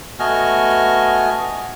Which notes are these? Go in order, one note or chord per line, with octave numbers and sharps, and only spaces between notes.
A3 B3 F#4 D#5 G#5 F6